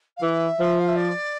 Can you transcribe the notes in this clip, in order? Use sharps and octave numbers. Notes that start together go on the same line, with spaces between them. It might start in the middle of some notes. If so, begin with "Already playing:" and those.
F5
E3 E5
F3
F5
E5
D5